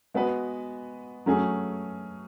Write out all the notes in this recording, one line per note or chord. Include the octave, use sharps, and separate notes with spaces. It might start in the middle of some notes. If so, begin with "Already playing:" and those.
G#3 B3 F#4 B4
F#3 A3 C#4 G#4